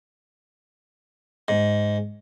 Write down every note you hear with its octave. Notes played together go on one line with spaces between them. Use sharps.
G#2